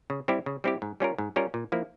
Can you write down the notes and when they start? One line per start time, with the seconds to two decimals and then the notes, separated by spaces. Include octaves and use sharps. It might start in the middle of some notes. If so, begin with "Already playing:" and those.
0.10 C#3
0.28 G3 C4 E4 G4
0.46 C#3
0.64 G3 C4 E4 G4
0.82 G#2
1.00 G3 C#4 F4 A#4
1.18 G#2
1.36 G3 C#4 F4 A#4
1.54 A#2
1.72 F3 A#3 E4